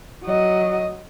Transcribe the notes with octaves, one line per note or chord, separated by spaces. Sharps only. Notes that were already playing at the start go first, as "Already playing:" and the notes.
F#3 D#5